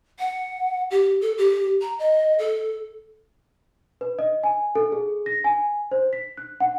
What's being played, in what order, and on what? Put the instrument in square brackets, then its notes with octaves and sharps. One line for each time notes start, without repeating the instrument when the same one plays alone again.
[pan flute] F#5
G4
A4
G4
A#5
D#5
A4
[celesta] B4
D#5
G#5
A4
G#4
A#6
G#5
C5
B6
F#6
F#5